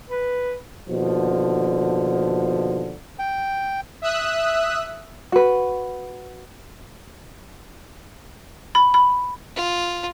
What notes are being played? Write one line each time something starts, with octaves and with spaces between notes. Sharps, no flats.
B4
D#2 B2 D3 F3
G5
E5 D#6 E6 F#6
F#4 B4
B5
B5
F4